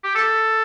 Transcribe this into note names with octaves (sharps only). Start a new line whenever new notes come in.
G4
A4